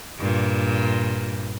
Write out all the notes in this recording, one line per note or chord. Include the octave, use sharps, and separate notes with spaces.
G2 A#2